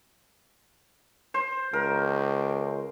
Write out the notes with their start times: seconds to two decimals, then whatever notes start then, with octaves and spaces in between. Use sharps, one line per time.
1.34 C5
1.73 C#2 A#4